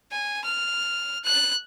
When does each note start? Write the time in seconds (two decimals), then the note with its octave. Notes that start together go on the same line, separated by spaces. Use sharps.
0.12 G#5
0.45 F6
1.24 F#6